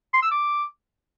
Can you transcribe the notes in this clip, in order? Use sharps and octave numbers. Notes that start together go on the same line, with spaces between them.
C6
E6
D6